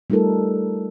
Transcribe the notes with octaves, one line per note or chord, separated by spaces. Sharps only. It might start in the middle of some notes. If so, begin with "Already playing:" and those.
G3 A3 D#4 F4 A4 A#4